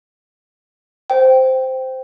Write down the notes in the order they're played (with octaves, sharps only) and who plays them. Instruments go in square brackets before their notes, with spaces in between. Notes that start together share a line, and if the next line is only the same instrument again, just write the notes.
[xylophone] C5 G5